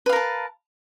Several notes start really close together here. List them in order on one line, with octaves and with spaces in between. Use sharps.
B4 F5 A#4 A5